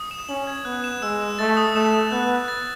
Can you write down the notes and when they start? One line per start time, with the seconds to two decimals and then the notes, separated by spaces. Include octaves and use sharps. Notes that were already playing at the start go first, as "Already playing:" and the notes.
Already playing: D#6
0.11 E7
0.29 C#4 F#7
0.47 G#6
0.65 B3 F#6
0.84 E7
1.02 G#3 E6
1.20 E7
1.39 A3 A6
1.57 D#6
1.75 A3 E7
1.94 D#6
2.12 B3 F#6
2.31 F#6
2.48 A6